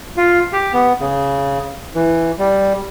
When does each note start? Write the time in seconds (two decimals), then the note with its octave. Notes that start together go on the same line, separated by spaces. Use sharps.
0.17 F4
0.53 G4
0.73 B3
1.00 C#3
1.95 E3
2.39 G3